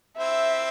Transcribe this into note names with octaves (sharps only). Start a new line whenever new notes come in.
C4 E4 E5